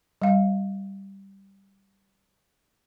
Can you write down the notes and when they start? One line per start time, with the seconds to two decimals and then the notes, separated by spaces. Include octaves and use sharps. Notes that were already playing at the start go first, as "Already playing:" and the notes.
0.22 G3 F5